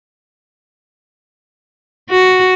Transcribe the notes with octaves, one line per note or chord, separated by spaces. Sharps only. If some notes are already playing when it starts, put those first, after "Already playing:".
F#4